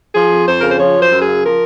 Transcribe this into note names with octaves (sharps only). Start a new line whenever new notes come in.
F3 G#4
F2
F2 C5
C#3 A#4
C5
F3 C#5
F#2
C5
F#2
G#4
C#3
F3 A#4